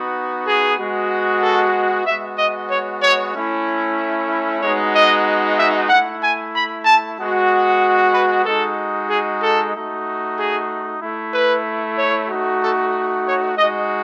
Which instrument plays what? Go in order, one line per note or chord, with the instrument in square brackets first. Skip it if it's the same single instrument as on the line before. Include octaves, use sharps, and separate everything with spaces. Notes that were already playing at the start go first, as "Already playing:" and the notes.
Already playing: [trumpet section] B3 D#4 F#4
G#4
G#3 B3 F#4
A4
G#3 B3 F#4 E5
D#5
C#5
C#5
A3 C#4 E4
G#3 B3 D#4 F#4 C#5
D#5
E5
A3 E4 F#5
G#5
B5
A5
G#3 B3 F#4
B4
G#3 D#4 F#4 A4
G#4
A4
A3 D#4 F#4
G#4
A3 E4
B4
C#5
A3 D#4 F#4
A4
C#5
G#3 D#4 F#4 D#5